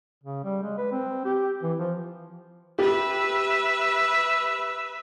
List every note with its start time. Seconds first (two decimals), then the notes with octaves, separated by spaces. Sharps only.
0.24 C#3
0.44 G3
0.63 G#3
0.78 B4
0.92 C4
1.25 G4
1.63 E3
1.79 F3
2.79 G4 B4 E5